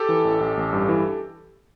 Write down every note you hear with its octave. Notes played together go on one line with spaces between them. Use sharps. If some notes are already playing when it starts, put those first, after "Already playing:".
Already playing: G4 A4
E3
A1
A1
A1
G2
E3